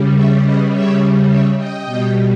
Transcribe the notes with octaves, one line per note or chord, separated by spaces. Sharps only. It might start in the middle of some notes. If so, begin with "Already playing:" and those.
Already playing: C#3 G3
C#5 E5
B4 D#5
C#5 E5
C#5 E5
D#5 G5
B2 G3